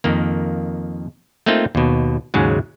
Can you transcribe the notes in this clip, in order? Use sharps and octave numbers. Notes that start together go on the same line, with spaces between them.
F2 D#3 A#3
A3 A#3 C4 D#4 F4
D#2 B2
D#2 G#2 C#3 F#3 G#3